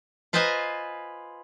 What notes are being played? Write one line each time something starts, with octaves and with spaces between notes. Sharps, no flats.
F4 B4 C5 D#5 G#5 A#5